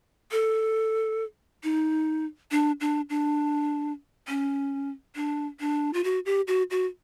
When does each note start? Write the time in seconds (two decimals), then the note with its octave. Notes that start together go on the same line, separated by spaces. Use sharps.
0.31 A4
1.63 D#4
2.51 D4
2.81 D4
3.10 D4
4.28 C#4
5.16 D4
5.60 D4
5.94 F4
6.04 F#4
6.26 G4
6.48 F#4
6.71 F#4